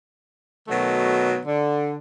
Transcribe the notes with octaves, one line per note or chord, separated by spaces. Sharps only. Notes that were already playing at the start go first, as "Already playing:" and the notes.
B2 D#3 F#3 A3
D3